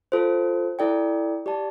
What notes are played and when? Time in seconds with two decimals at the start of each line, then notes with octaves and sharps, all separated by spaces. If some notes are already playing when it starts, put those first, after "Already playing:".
0.12 F4 A4 C5
0.79 E4 A4 D5 G5
1.46 G4 D5 A5